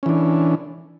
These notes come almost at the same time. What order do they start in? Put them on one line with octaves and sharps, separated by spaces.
C#4 E3 D4